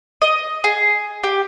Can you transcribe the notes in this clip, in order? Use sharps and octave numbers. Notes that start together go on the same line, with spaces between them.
D#5
G#4
G4